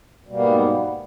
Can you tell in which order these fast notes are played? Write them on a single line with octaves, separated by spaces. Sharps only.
B2 G3 A#3 B3 G#2